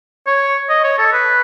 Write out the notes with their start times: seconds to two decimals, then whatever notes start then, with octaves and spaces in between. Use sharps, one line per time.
0.27 C#5
0.69 D#5
0.84 C#5
0.98 A4
1.13 B4